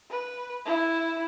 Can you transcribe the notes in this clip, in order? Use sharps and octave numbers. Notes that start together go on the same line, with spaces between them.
B4
E4